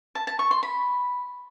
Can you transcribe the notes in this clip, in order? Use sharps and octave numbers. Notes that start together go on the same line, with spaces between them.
A5
A5
C#6
C6
B5